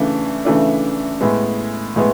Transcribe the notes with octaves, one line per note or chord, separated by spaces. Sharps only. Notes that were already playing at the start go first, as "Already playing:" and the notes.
Already playing: C#3 E3 A3 D4
C#3 E3 A3 D4
A2 G#3 B3
A2 G#3 B3